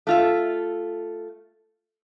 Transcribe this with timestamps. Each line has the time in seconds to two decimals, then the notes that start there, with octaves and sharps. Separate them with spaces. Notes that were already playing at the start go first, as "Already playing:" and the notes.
0.07 A3 F4 E5